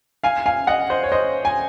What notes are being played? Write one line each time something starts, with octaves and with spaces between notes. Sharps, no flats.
F5 G#5
F5 G#5
D#5 F#5
C5 D#5
C#5
C5 D#5
G#5